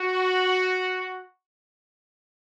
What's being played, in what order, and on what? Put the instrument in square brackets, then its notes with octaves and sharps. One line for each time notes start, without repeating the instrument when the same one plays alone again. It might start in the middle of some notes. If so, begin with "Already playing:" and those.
Already playing: [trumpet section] F#4